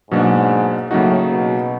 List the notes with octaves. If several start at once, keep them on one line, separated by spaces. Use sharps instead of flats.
G#2 B2 F#3 A#3 D4 F#4
A2 C#3 F#3 A#3 D#4 F#4
B2